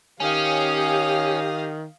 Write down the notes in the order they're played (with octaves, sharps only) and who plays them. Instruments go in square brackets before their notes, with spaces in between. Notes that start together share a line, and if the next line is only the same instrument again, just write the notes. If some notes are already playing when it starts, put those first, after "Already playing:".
[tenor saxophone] D#3 [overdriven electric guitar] C#4 [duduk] G4 [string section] F5 D#6